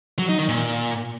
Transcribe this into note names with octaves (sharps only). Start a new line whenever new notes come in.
F#3
D#4
D#3
A#2